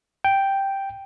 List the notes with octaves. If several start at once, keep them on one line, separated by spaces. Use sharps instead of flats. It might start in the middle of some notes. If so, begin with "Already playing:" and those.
G5